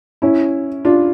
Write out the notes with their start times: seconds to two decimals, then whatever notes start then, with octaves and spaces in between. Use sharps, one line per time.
0.22 C#4 E4
0.85 D4 F4